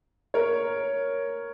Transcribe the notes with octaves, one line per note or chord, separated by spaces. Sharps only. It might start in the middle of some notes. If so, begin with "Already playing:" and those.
A#4 C#5